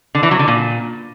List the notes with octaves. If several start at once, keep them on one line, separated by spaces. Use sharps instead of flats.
D3
E3
F#3
D3
A#2